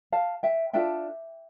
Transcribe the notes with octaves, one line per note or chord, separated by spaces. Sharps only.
F5 A5
E5 G5
D4 F4 A4 E5 G5